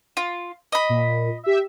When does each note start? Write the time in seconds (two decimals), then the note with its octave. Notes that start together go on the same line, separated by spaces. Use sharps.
0.17 F4
0.72 D#5 B5
0.89 A#2
1.43 G4 E5